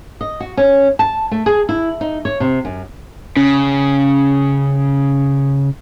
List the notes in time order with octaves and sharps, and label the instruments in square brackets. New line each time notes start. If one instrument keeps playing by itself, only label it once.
[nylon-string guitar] D#5
F#4
C#4
A5
A3
G#4
E4
D#4
C#5
C3
F#2
[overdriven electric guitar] C#3 [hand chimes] C#4